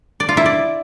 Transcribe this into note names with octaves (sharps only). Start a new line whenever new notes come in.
D5
F4
E4
D5